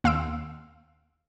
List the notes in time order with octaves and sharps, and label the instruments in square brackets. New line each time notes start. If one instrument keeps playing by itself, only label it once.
[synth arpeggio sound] D#2 F5 C6 E6 D7